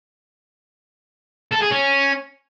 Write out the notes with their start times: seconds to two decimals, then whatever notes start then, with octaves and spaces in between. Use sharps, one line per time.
1.52 A4
1.62 G#4
1.72 C#4